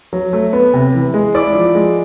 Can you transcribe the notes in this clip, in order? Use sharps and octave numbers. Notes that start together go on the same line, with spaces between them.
F#3
A3
B3
C3
E3
G#3
E4 D5 D6
F3
G#3